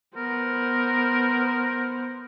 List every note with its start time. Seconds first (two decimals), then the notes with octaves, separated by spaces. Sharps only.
0.16 B3 A#4 C5